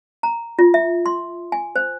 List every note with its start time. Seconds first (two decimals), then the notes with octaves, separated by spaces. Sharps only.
0.23 A#5
0.59 F4
0.74 E5
1.06 C6
1.52 G#5
1.76 C5